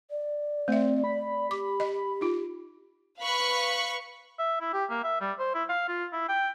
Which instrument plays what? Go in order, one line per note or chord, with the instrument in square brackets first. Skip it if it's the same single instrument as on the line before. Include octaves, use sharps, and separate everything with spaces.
[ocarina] D5
[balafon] A3 E5 [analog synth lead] C4
[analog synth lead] B5
[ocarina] G4 [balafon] D6
[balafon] D#5
D#4 F4
[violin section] B4 F5 B5 C#6 F#6 C#7
[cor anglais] E5
E4
G4
A#3
E5
G3
C5
E4
F5
F4
E4
G5